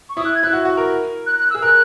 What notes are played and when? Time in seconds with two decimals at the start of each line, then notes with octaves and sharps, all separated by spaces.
0.09 C#6
0.17 E4 D#6
0.25 F#6
0.35 G#6
0.43 E4 F#6
0.53 F#4
0.65 F#4
0.77 A#4
1.26 F#6
1.39 F#6
1.50 E6
1.55 G#4
1.62 A#4 F#6